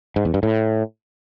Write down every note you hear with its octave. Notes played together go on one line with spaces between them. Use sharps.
G#2
E2
G2
A2